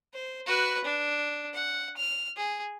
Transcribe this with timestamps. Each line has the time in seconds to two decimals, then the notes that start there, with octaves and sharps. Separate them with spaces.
0.14 C5
0.46 F#4 B4
0.84 D4
1.53 F#5
1.97 F6
2.36 G#4